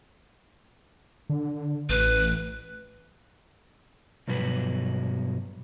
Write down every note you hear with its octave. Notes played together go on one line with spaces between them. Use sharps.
D3
A1 B4
G2 B2 F3 F#3 B4